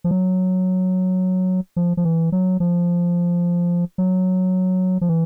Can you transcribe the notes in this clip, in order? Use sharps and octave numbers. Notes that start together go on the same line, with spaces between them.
F3
F#3
F3
F3
E3
F#3
F3
F#3
F3
E3